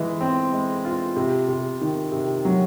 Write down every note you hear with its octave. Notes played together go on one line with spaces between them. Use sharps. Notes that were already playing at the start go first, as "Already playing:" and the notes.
Already playing: E3 G#3
C4
G#3
F4
C3
C3
D#3
C3
F#3